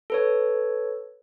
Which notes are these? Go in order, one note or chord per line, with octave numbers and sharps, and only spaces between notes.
A4 B4 C#5